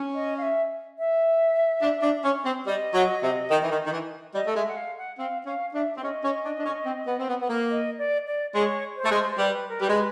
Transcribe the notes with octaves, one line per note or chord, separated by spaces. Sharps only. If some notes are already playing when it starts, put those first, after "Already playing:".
Already playing: C#4
D#5
F5
E5
E5
D4
D4
C#4
C4
G3 D#5
F#3
C3
D#3
E3
D#3
D#3
E3
G3 D#5
A3
G#3 E5
F#5
F5
F#5
C4 F5
C#4 F5
D4 E5
C4
C#4 D#5
C#4
D4
D4
C#4
C4
B3
C4
B3
B3
A#3
D#5
D5
D5
G#3 C#5
C5
A3
G#3
C5
G3 B4
A#4
G3 B4
G#3